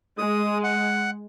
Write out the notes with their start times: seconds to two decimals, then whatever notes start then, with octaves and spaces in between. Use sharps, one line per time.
0.18 G#3 D#6
0.63 F#5